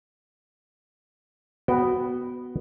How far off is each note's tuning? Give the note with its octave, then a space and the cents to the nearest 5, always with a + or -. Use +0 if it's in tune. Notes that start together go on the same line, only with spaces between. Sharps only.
B3 +0 F#4 +0 G5 -20